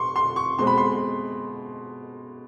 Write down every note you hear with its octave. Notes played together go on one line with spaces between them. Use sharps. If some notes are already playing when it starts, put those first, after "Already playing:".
Already playing: C6 C#6
C6
C#6
B2 G#3 C4 C6
B5
C6